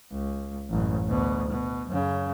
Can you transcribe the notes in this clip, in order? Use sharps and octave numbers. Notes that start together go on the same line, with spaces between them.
C#2
A1 F#2
D2 B2
B2
F#2 C#3